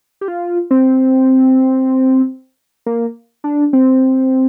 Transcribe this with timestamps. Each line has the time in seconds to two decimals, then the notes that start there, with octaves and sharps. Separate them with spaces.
0.21 G4
0.28 F4
0.71 C4
2.86 A#3
3.44 D4
3.73 C4